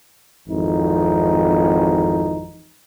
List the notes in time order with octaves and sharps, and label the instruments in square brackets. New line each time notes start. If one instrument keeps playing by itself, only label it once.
[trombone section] G#1 F2 E3 D#4